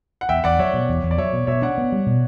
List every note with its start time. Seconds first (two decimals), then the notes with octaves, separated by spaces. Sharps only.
0.21 F#5
0.29 E2 E5 G5
0.44 E2 D5 F#5
0.59 F#3 C#5 E5
0.74 B2
0.89 E2
1.03 E2
1.11 D5
1.18 F#3 C#5 E5
1.33 B2
1.47 B2 C#5 E5
1.62 D4 D5 F#5
1.78 B3
1.92 G3
2.07 B2